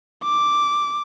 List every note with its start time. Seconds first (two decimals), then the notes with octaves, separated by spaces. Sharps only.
0.24 D6